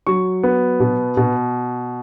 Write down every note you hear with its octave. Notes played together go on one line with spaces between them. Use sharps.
F#3 C#6
B3
B2
B2